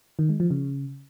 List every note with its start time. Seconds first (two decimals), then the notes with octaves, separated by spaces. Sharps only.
0.19 D#3
0.29 G#3
0.40 F3
0.51 C#3